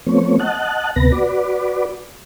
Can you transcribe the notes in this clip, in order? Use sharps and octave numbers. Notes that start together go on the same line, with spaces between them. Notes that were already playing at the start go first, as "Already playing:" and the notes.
F3 A3 B3 C4 C#5
D#5 F#5 A5 F#6
D2 C3 B3 B4 A#6
F#4 B4 D5